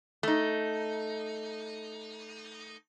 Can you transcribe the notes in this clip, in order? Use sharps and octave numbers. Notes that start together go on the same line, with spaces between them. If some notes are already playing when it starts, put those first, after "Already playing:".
A3 D#4